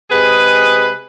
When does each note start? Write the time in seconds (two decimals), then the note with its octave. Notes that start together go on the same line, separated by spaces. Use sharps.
0.10 C3 G#3 G#4 B4